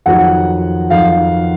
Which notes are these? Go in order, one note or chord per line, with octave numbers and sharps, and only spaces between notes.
F2 D#3 F#3 F#5
F2 D#3 F#3 F5